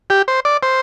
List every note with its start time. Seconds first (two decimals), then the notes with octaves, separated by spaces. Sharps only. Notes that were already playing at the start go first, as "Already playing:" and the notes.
0.10 G4
0.28 C5
0.45 D5
0.63 C5